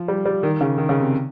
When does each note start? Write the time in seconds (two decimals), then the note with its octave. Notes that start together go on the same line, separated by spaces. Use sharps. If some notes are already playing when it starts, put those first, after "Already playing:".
Already playing: F3
0.08 G3
0.26 G3
0.43 D#3
0.61 C#3
0.78 D#3
0.89 C#3
1.00 C3